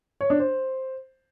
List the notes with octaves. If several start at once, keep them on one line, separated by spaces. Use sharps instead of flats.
C#5
D4
C5